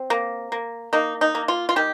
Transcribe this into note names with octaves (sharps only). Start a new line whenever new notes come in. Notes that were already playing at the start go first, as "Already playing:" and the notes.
Already playing: C4
A#3
A#3
A#3 D#4
D#4
A#3
F4
F4
D#3 G4